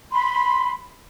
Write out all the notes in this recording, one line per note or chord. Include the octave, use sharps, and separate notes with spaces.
B5 C6